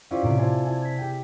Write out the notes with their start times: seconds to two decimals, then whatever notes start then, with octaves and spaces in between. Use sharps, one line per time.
0.11 C#4 E4 F4 G4 C5 D5
0.22 A2 C3 D7
0.38 E4 F4 C5 G#5 A5
0.63 E4 G#5 A5
0.82 G#6 B6
0.98 G4 G5